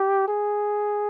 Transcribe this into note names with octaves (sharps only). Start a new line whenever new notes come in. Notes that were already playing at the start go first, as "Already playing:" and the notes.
Already playing: G4
G#4